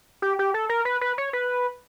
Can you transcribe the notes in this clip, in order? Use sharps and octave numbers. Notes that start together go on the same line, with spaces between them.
G4
G4
A4
A#4
B4
B4
C#5
B4